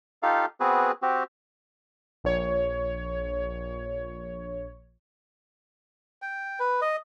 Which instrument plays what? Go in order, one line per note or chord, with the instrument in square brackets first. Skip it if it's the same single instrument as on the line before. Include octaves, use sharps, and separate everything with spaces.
[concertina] D#4 F4 G4 A4 F5
B3 C4 F#4 G#4 B4
C4 F#4 G4
[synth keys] A#1 C#5
[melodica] G5
B4
D#5